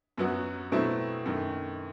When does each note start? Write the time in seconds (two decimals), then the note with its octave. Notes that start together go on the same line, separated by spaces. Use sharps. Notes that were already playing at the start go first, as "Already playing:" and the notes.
0.17 F#2 F#3 B3 F#4
0.72 B2 F#3 A3 C4 E4
1.25 F#2 D#3 A3